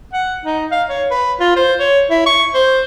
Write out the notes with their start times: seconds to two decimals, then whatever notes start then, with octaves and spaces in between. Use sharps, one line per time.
0.13 F#5
0.45 D#4
0.71 F5
0.89 C#5
1.11 B4
1.40 F4
1.56 C5
1.80 C#5
2.10 E4
2.26 C#6
2.54 C5